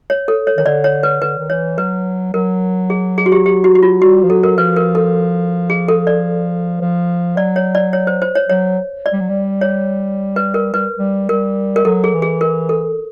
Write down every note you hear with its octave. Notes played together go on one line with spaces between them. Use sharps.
C#5
A4
C#5
D#3 C#5
D3 D5
C#5
B4
D3 B4
D#3
E3 C#5
F#3 B4
F#3 A#4
G#4
G#4
F#4
G4
G4
F#4
F#4
F4
G3 F#4
F3
F#3 A4
A#4
F3 B4
A#4
A4
G#4
A4
D5
F3
F#3 D5
C#5
D5
C#5
C5
C5
C#5
F#3 C#5
D5
G3
F#3
G3
C#5
B4
A#4
G3 B4
G3
G3 A#4
A#4
F#3 A4
G#4
E3
G#4
A#4
A4